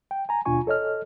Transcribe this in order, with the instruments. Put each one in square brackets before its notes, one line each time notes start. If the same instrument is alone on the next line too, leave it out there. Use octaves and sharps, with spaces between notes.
[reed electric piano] G5
G#5 A#5
D#2 B2 D4 F4 G#5 C#6
A4 C#5 D#5 F6